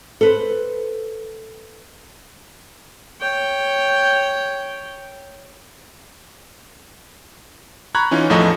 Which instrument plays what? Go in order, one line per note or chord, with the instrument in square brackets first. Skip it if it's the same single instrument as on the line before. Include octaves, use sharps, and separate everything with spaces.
[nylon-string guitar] A4 B4 C5
[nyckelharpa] C#5 G5
[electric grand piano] A#5 B5 C#6 F#6 G#6
E3 C#4 D#4 F4
E2 A2 F3 A4 D#5 A#5